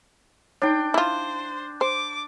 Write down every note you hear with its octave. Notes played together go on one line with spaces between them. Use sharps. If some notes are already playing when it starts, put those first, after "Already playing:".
D4 D#4 C#5 G5
E4 F4 C5
C5 D6